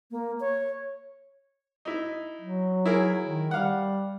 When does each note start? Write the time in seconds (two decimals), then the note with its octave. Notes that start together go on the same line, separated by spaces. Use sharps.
0.11 A#3
0.40 C#5
1.85 D#4 E4
2.42 F#3
2.86 E4 G#4 A#4
3.24 D#3
3.51 G3 F5 F#5